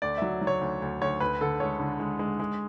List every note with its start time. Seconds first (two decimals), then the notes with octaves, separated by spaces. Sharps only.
0.02 D2 D5
0.18 F#3 E5
0.41 F#3
0.47 C#5
0.61 D2
0.82 D2
1.01 D2 C#5
1.20 D2 B4
1.41 D3 A4
1.60 G#3 C#5
1.80 D3
2.00 G#3
2.19 G#3
2.40 G#3